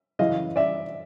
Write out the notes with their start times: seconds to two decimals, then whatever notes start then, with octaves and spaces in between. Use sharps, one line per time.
0.19 F#2 C#3 E3 D#5 F5
0.56 D5 E5